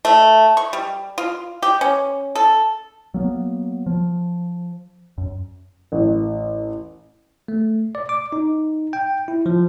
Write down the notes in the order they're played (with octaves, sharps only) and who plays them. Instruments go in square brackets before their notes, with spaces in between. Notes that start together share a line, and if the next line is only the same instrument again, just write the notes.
[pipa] A3
C#6
G3
F4
G4
C#4
A4
[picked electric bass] F#3 A#3 B3
F3
F#2
[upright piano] A1
[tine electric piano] A3
D5
D6
D#4
G5
E4
F3